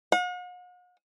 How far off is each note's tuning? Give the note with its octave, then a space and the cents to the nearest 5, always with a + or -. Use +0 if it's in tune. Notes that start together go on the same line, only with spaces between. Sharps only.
F#5 -45